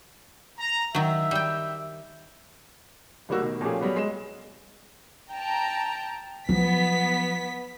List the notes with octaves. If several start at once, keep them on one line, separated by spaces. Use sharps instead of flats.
A#5
D#3 F#3 E5
G3 G5
D1 D#3 G3 A#3 F#4 E6
B2 D#3
A#2 F3 A3 C#4 G4 G#4
F#3 G3 B3 F#4
G#3 E7
G5 A5 A#5
F3 F#3 B3 B6